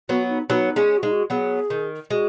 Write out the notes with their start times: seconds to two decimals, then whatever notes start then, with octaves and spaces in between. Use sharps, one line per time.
0.09 F#3 B3 F#4
0.29 D#4
0.49 F#3 B3 D#4
0.76 G#3 C#4
0.90 G#4
0.98 F#4
1.03 G#3 D#4
1.12 F#4
1.30 F#3 B3 G#4
1.70 D#3
2.11 G#3 F#4